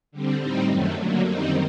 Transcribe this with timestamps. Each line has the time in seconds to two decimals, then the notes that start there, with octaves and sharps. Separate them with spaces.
0.12 D3 G3 C4
0.39 A2 G3 C4 D#4
0.68 F#2 D#3 F#3 A3
0.96 D3 F#3 A#3
1.25 F#2 D#3 G3 C4 D#4